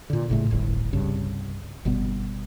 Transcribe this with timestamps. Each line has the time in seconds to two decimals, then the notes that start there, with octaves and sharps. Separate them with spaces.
0.10 A#2 D3
0.30 F#1 A2 C#3 A3
0.51 D1 G1 A2
0.93 C2 G2 C#3
1.85 G1 B2 G3 B3